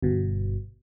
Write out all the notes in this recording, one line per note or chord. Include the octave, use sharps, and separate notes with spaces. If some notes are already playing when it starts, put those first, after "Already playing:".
G1 B2